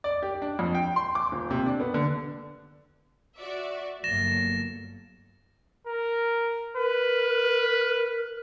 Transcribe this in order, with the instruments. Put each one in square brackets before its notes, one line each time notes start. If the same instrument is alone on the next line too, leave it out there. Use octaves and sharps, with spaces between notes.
[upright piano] D5
G4
D4
F2
G5
C6
D6
D#1
C3
D4
B3
D3
[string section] F#4 D5 E5
[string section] G1 F#3 A#3 [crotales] A6 A#6 E7
[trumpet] A#4
[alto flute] A#4 [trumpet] B4